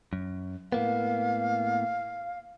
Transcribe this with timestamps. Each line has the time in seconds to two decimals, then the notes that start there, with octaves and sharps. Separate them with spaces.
0.13 F#2
0.72 A2 A#3 B3 F5